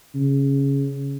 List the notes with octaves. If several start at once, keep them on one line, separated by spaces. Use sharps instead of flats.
C#3